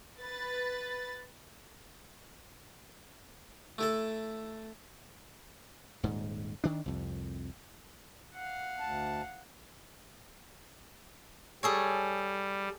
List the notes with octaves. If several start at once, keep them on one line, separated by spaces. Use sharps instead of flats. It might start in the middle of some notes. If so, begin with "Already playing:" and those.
B4 A6
A3 E4 A4
D#1 G#2
D#3 D4
C2 F2
F5 F#5
D2 A5
G3 G#4 A4 C#5